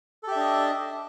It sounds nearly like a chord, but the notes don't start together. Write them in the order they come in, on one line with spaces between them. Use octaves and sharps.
A4 G4 E5 D4 D#5